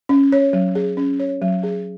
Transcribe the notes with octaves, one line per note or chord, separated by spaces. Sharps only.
C#4
C#5
F#3
G#4
C#4
C#5
F#3
G#4